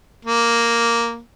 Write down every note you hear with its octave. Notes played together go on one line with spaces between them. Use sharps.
A#3